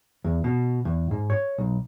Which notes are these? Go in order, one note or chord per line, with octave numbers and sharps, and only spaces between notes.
E2
B2
E2
G#2
C#5
B1